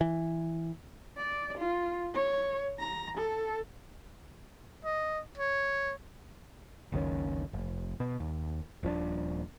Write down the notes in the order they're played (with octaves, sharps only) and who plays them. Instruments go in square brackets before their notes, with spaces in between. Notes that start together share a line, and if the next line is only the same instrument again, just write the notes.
[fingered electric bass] E3
[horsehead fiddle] D5
F4
C#5
A#5
A4
[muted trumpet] D#5
C#5
[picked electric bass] F#1 C#2 D#3 C#4
F1
B2
D#2
D#1 F3 C#4 D4